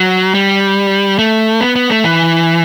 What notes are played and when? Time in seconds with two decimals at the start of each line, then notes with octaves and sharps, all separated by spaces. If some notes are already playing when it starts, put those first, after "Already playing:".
Already playing: F#3
0.35 G3
1.19 A3
1.61 B3
1.76 B3
1.90 A3
2.04 E3